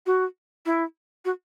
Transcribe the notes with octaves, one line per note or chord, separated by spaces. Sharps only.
F#4
E4
F#4